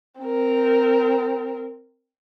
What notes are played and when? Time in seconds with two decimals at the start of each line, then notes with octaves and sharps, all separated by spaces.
0.21 C4 A#4